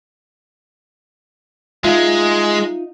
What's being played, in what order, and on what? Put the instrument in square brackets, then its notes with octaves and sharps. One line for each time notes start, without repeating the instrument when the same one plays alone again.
[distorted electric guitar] G#3 [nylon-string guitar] D#4 F4 E5